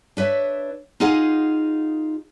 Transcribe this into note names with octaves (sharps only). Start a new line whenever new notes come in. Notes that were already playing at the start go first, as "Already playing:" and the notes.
D4 B4 C#5 E5
D#4 F4 G#4 D#5 F5 F#5